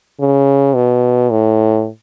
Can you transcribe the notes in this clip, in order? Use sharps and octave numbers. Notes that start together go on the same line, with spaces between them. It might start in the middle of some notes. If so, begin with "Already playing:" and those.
C#3
B2
A2